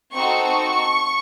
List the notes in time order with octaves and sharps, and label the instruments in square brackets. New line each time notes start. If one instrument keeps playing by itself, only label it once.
[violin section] C4 D#4 F#4 A4 C#6